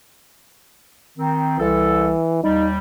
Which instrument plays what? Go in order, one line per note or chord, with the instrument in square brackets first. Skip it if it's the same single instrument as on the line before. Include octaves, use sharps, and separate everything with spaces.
[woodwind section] D#3 C4
[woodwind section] C2 A4 [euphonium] E3
[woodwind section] D#2 G3 [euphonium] D#4